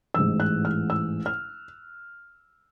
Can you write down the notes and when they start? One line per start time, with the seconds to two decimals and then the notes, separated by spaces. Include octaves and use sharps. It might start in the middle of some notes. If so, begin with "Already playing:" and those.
0.14 A1 G#2 E3 E6
0.40 F#6
0.65 F6
0.90 E6
1.26 F6